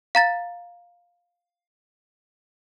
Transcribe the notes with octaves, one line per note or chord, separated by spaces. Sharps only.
F5 A#5 A6